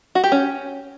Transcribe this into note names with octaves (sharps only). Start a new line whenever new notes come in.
F#4
G4
C#4